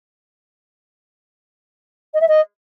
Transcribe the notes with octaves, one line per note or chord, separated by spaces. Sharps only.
D#5
E5
D#5